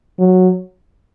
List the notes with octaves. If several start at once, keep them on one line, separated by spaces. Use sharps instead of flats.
F#3